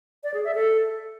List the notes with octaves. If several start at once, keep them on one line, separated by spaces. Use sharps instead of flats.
D5
G#4
E5
A4